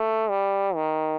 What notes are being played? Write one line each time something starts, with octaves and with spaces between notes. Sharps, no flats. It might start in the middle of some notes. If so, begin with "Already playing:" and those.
Already playing: A3
G3
D#3